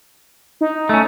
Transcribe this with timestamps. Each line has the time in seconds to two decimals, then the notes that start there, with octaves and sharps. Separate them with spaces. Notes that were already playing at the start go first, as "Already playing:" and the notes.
0.61 D#4
0.89 A3 C#4